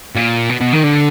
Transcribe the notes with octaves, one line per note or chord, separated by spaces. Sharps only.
A#2
B2
B2
D#3
D3